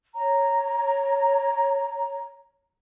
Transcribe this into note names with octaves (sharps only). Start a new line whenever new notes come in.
C#5 A#5